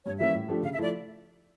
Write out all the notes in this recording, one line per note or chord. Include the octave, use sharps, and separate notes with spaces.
G2 C#5
E3 G3 A#3 C#4 E5
A2
F3 A3 D4 G4
C#3 F5
E5
F3 A3 E4 D5